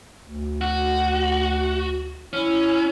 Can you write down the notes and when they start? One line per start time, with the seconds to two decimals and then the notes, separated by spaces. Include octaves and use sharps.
0.21 D2
0.61 F#4
2.33 C#4 E4